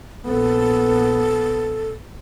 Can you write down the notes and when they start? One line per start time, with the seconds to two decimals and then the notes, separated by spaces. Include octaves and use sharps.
0.25 A#1 B3 A4